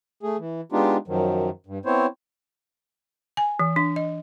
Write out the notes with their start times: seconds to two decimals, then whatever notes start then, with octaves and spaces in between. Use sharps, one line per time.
0.23 A3 G#4
0.39 E3
0.72 G#3 B3 D4 D#4 F4 G4
1.08 F#2 D#3 F3 F#3
1.66 G2
1.85 B3 C4 E4 C5 C#5
3.37 G#5
3.59 E3
3.76 D4
3.96 D#5